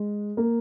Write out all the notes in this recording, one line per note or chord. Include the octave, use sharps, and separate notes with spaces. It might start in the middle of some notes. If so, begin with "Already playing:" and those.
Already playing: G#3
A#3